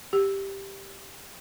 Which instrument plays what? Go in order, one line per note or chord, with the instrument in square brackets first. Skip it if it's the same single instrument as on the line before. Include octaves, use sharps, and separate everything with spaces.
[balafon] G4